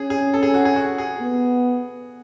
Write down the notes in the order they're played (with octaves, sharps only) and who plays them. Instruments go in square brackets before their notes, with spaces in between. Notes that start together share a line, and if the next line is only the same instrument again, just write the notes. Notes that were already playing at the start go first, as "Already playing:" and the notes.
Already playing: [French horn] C#4 [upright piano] G#4
[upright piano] G#4
A4
G#4
F#4
G#4
F#4
G#4
[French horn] B3